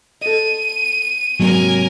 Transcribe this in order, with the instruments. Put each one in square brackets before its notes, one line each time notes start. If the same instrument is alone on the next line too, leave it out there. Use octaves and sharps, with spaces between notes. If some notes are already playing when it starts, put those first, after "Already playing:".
[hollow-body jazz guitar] A4 D#5 [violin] D#7
[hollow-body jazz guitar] G#2 C3 [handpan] F#3 A#3 [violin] A#4 G#5